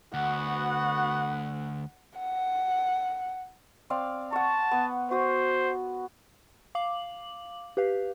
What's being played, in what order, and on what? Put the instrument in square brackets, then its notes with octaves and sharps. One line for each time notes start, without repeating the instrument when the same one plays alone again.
[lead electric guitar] D2 [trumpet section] B3 F#4 [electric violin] F#5
[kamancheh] F#5
[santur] C4 D5 F5
[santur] F#5 C#6 [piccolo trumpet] A5
[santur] B3
[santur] F#4 D#6 [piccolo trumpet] C5
[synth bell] F5 D6 F#7
G4 B4 F5